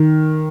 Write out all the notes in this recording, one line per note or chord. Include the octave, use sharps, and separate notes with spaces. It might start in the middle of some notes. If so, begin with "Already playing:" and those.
Already playing: D#3